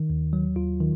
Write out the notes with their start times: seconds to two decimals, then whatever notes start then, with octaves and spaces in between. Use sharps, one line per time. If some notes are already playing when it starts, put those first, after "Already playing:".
Already playing: D#3
0.10 D#2
0.33 F#3
0.56 D#2 F4
0.80 D#3